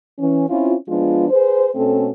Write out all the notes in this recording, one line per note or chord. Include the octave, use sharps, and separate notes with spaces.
E3 C#4
C4 C#4 E4 F4
F3 G#3 B3 D4 F4
G#4 B4 C5
B2 A3 C4 C#4 A4